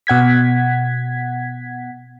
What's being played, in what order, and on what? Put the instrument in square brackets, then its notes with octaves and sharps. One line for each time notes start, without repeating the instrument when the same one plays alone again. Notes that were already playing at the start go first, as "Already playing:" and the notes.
[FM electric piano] B2 F#5 G#6 B6